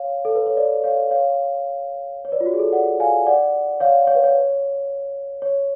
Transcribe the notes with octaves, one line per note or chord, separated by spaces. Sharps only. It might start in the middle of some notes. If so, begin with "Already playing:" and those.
Already playing: C#5 F5
A4
B4
C#5
B4 D5
C#5 F5
C#5 F5
C#5
B4 D5
F4
F#4
G#4
A4
D5 F#5
F5 G#5
D5 F#5
C#5 F5
C#5
B4
C#5
C#5